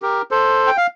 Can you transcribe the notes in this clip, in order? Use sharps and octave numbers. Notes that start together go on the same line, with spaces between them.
G4 A#4
A4 C5
G5
F5